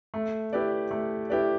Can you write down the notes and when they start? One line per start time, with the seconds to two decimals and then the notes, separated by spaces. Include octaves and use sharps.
0.14 A3
0.53 E4 G4 B4 D5
0.91 A3
1.30 E4 G4 B4 D5